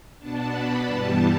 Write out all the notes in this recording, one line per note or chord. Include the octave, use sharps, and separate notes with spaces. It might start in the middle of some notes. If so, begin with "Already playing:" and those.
B2 B3 D4 A5
B5
G2 E3 G3 B3 A5